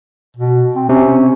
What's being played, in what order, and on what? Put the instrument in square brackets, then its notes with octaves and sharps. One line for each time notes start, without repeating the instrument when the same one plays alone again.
[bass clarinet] B2
C4
[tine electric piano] C3 [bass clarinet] C#4